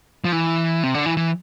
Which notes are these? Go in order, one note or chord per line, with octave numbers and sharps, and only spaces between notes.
F3
E3
C3
D3
E3
E3